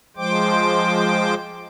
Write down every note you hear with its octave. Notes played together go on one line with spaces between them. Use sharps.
F3 G#3 C5 G5 D6